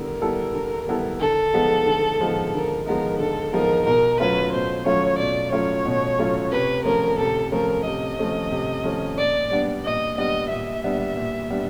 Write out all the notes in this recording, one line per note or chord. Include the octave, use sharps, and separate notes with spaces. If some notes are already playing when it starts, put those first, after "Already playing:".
Already playing: D3 G3 B3 E4 A#4
G3 B3 E4 A4
D3
G3 B3 E4 A4
D3 A4
F3 G#3 B3 D#4
D3
F3 G#3 B3 D#4
D3 A#4
F3 G#3 B3 D#4 A#4
D3 A4
F3 G#3 B3 D#4 A#4
B2 A#4
F#3 A3 C#4 F4 B4
B2 C5
F#3 A3 C#4 F4 C#5
B2 D5
F#3 A3 C#4 F4 C#5
B2
F#3 A3 C#4 F4
C3 B4
F3 A3 C#4 A#4
C3 A4
F3 A3 C#4 A#4
C3 D#5
F3 A3 C#4
C3
F3 A3 C#4
A#2 D5
G3 B3 D4
A#2 D#5
G3 B3 D4 D#5
A#2 E5
G3 B3 D4
A#2
G3 B3 D4